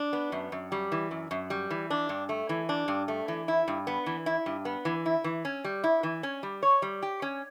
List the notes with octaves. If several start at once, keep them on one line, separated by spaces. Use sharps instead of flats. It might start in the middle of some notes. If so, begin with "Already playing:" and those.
Already playing: D4
B3
F#2
F#2
G3
E3
F#2
F#2
G3
E3
D4
G2
A3
E3
D4
G2
A3
E3
E4
G2
B3
E3
E4
G2
B3
E3
E4
E3
C#4
G3
E4
E3
C#4
G3
C#5
G3
G4
C#4